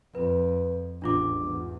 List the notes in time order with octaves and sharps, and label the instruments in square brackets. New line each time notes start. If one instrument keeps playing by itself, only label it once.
[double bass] F2 [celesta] B4
[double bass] A1 E2 [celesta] D4 F4 D6
[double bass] E2 G#2